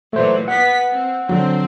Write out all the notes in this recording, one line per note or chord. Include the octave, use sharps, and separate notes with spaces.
A#2 E3 F#3 A3 C5
B3 F#5 B6
C4
D3 F#3 C4